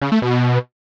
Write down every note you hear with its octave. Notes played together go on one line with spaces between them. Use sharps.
C#3
A3
B2